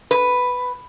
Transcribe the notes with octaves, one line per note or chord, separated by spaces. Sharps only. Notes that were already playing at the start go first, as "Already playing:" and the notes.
B4